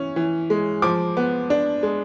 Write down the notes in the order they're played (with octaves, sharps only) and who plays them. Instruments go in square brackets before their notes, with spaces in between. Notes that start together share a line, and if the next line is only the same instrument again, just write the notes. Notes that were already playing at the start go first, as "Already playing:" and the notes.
Already playing: [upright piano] E3 C#4 C#6
E3
G#3
F3 D6
B3
D4
G#3